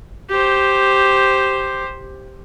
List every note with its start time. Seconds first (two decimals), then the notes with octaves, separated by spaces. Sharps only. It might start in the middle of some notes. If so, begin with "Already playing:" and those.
0.30 G4 C5